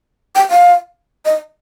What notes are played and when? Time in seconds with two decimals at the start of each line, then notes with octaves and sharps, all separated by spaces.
0.35 G5
0.50 F5
1.25 D#5